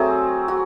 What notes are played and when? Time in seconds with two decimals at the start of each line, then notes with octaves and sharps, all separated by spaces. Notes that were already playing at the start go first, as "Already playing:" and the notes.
Already playing: F#3 A3 C4 G#4 C5
0.48 F#4